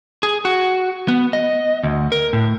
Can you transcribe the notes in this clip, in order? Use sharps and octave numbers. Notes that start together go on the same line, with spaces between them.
G#4
F#4
B3
D#5
D2
A#4
A2